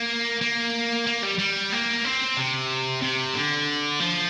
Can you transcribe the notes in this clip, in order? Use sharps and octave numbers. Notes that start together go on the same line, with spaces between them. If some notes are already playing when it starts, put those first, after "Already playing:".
Already playing: A#3
A#3
A#3
G3
G3
A#3
C4
C3
C3
D3
F3